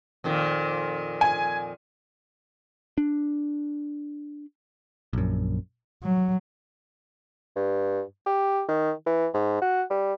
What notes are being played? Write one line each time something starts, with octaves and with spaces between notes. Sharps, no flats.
F2 A#2 D#3
G#5
D4
A#1 F#2
F#3
G2
G4
D#3
E3
G#2
F#4
G3